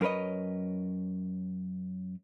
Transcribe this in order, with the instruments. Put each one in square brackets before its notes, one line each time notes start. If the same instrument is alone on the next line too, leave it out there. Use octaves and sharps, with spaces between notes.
[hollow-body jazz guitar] F#2 A#4 B4 C#5 D#5